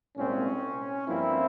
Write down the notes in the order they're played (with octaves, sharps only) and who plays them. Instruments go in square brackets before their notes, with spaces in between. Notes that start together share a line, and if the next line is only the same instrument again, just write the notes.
[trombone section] C2 A#2 G#3 C4 C#4
G2 F3 A#3 C4 E4